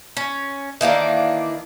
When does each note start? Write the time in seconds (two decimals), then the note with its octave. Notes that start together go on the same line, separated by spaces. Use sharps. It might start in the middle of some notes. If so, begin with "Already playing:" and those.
0.17 C#4
0.81 D#3 E3 A#3 D4